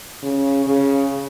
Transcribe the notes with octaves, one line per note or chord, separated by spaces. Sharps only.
C#3
C#3